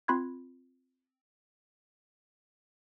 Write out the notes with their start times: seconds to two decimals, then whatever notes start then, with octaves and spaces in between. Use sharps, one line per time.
0.08 C4 F4 B5 C6 F#6 G#6